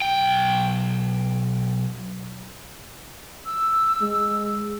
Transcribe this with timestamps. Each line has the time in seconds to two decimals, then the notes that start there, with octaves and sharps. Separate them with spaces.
0.02 B1 G5
3.46 E6
4.01 G#3